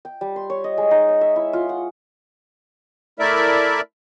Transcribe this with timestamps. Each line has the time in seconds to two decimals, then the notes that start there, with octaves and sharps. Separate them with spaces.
0.05 G5
0.21 G3
0.36 C6
0.50 C#5
0.64 D#5
0.78 G#3
0.91 D#4
1.09 C#5
1.21 E5
1.36 E4
1.53 F4
1.69 F#5
3.20 A3 E4 A#4 D5 E5